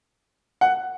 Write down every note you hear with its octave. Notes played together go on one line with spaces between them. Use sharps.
F#5